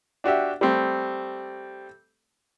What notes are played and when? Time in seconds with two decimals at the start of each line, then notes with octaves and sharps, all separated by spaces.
0.24 D4 F#4 G4 E5
0.61 G3 A3 C4